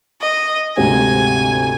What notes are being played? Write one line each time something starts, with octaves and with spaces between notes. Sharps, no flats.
D#5
D2 G#2 C3 G#5